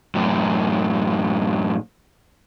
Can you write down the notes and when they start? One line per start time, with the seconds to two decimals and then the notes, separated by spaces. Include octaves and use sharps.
0.15 F#2 A2